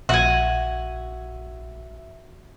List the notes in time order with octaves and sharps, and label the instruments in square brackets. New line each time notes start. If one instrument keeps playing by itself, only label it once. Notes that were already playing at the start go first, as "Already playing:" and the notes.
[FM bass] A#1 [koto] F#4 G#5 [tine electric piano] E5